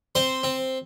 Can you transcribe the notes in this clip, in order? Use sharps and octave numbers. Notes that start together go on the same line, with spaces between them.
C4 C5
C4